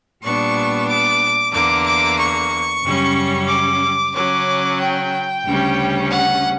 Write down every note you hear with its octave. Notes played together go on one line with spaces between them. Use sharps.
A#2 G3 B3 D4 C#6
D6
E2 D3 A#3 D6
D6
C#6
F#2 C#3 G3 C#4
D6
C#3 F#3 C#4 D6
G5
D2 C#3 G3 C#4
F#5